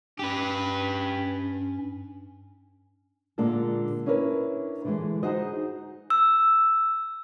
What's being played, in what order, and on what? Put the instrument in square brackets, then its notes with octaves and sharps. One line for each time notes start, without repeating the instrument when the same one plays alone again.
[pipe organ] G2 C#4 [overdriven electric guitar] G4 B4
[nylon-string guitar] A#2 D3 G#3 A4
C#4 D4 E4 A#4 B4
D3 E3 G#3
D#4 F#4 G#4 C5 D#5
[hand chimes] E6